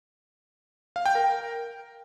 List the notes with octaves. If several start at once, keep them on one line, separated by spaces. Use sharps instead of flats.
F5
G5
A#4